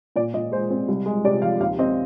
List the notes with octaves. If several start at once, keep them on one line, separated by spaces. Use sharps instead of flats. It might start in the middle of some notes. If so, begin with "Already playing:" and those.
A#2 D5
A#2 D#5
G#3 C5
C4 C5
C2
G#3
C3 D5
F3 F5
D#2 F5
C4 D#5